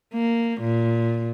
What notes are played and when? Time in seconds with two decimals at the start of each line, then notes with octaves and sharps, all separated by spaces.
0.14 A#3
0.61 A#2